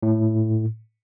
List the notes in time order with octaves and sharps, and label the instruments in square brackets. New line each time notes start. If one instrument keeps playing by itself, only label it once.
[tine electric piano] A2